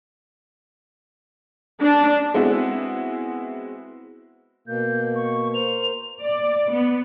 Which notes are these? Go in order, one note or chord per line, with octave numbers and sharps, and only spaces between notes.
D4
G#3 B3 C4 E4 F#4
B2 A#3 G6
C#6
A#4 C5 F7
D5
B3